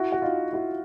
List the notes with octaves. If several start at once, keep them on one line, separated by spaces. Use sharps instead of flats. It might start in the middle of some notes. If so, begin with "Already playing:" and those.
Already playing: E4 F#4
F#4
D#4 F4
E4 F#4